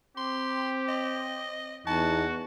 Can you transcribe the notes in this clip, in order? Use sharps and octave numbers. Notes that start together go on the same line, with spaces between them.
C4 G4 C6
D#5
E2 D#4 F#4 A5